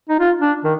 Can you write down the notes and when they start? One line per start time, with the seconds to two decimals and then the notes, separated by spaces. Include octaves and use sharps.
0.09 D#4
0.20 F4
0.41 D4
0.65 D#3